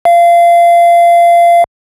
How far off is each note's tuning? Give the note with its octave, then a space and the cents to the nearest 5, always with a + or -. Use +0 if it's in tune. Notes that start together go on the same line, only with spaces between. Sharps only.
F5 -25